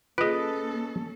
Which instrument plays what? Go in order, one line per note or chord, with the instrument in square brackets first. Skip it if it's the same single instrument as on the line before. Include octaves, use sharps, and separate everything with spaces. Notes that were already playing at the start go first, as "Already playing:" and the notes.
[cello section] A#3 C#4 A4 [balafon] F4 G#4 [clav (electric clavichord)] B4 D#5